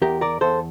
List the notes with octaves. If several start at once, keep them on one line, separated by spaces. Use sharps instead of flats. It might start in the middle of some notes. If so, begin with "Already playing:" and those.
E2 G4 A#4
A#4 D5
E2 A4 C5